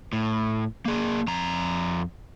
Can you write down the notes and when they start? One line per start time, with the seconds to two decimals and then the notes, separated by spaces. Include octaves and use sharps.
0.13 A2
0.86 A#3 G#4
1.28 F2 A#5